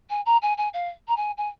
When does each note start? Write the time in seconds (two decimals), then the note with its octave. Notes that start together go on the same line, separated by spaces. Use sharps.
0.10 G#5
0.26 A#5
0.42 G#5
0.57 G#5
0.73 F5
1.08 A#5
1.16 G#5
1.37 G#5